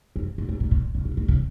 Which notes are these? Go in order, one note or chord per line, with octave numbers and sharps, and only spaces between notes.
F#2
G#2
G#2
A#2
A#2
C#3
B2
A#2
C#3